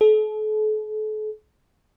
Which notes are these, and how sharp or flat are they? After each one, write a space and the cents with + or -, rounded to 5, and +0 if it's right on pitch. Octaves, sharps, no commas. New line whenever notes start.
A4 -40